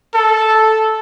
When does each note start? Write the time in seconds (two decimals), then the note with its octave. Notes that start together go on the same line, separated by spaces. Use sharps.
0.14 A4